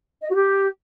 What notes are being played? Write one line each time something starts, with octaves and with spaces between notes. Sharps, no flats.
D#5
F#4
G4